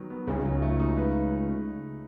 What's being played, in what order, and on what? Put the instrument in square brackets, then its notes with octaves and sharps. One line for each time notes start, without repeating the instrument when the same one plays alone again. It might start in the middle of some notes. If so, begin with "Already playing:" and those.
Already playing: [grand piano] D#3 F#3 B3
B3
[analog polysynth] C#2 C#3 [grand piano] D#4
[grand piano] F#3
A3
D#4
B4